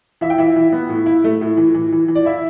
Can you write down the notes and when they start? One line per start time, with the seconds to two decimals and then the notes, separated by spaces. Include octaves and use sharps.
0.21 E3 E5
0.30 G5
0.38 E3 E5
0.56 E3
0.72 B3
0.89 A2
1.06 E4
1.24 A3
1.41 A2
1.57 E3
1.74 E3
1.92 E3
2.08 E3
2.15 D5
2.25 E4 E5